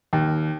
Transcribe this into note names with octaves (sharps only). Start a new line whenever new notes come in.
D#2